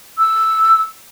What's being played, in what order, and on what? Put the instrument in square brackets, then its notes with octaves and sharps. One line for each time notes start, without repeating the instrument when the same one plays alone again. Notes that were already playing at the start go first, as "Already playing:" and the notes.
[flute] E6